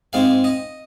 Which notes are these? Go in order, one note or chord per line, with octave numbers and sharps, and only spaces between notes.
G#2 G#3 C4 F5
D#5